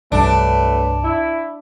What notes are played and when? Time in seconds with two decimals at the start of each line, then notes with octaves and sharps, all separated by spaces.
0.12 C2 G2 F#3 A3 D4 B4
1.04 E4